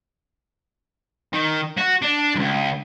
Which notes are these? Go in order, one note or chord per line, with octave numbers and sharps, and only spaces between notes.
D#3
F#4
D4
C#2 F#2